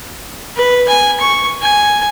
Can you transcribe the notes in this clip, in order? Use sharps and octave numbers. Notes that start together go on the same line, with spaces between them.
B4
G#5
C#6
G#5